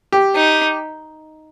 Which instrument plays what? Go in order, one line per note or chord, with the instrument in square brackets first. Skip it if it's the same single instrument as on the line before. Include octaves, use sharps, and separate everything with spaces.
[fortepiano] G4
[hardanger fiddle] D#4